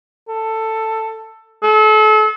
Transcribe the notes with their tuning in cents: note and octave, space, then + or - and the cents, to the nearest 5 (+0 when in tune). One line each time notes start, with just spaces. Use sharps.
A4 +10
A4 -35